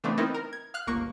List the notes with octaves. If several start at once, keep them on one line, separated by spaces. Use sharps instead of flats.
C#3 E3 A3 B3 C4 D4
B3 C4 D#4 E4 A#4
A#4
G#6
F5 F6 F#6
G1 C#2 A#3 C#6